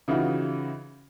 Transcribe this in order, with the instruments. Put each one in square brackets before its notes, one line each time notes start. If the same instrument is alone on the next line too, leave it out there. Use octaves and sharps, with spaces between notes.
[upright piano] C#3 E3 D#4 F4 F#4